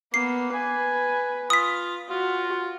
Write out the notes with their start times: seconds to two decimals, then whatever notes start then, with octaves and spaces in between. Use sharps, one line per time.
0.14 A#3 B3 C7
0.54 B4 G#5
1.50 F4 D#6 B6
2.10 F4 F#4